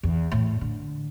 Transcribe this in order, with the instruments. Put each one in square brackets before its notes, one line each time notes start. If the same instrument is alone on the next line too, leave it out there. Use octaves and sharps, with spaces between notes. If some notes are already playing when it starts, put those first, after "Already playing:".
[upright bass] E2
A2
D3